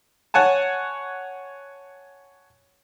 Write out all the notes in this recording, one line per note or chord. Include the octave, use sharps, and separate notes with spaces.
C#5 F#5 G#5 A5